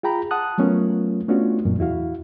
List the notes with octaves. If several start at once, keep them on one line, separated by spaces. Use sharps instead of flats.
F4 G#4 G5 A#5 B5
F#5 A5 D#6 F#6
F#3 A3 B3 C#4 F4 A#4
A3 B3 C#4 D4 F4 F#4
F#2 A#2
E2 E4 F#4 F5